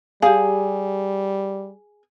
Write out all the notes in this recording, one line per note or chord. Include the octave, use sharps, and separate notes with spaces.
G3 G4 G#4 F5